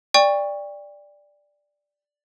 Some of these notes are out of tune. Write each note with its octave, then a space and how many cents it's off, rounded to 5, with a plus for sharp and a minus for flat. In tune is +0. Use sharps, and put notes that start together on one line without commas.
D5 +0 G5 +35 C#6 +0